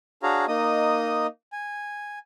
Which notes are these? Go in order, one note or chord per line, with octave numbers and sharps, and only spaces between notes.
D4 F#4 G#4 C#5 F5 A#5
A#3 D#4 D#5 D#6
G#5